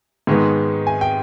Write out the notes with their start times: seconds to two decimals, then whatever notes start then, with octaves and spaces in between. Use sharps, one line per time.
0.27 G#2 D#3 G#3 B3
0.87 G#5
1.01 G5